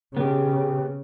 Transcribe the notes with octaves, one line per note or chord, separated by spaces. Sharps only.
C#3 B3 G4